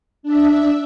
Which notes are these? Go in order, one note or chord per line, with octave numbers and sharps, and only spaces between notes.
D4 E5